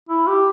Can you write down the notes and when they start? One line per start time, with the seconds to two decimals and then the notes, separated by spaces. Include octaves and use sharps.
0.09 E4
0.27 G4